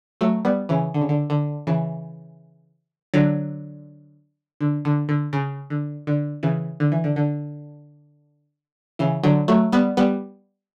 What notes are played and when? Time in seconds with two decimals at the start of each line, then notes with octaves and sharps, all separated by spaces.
0.21 F#3 A3
0.45 G3 B3
0.69 C#3 E3
0.94 D3
1.01 C#3
1.09 D3
1.30 D3
1.67 C#3 E3
3.14 D3 F#3
4.61 D3
4.85 D3
5.09 D3
5.33 C#3
5.70 D3
6.07 D3
6.43 C#3 E3
6.80 D3
6.92 E3
7.04 D3
7.16 D3
8.99 C#3 E3
9.23 D3 F#3
9.48 F#3 A3
9.72 G3 B3
9.97 G3 B3